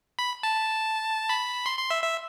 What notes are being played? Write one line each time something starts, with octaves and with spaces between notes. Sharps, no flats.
B5
A5
B5
C6
C6
E5
E5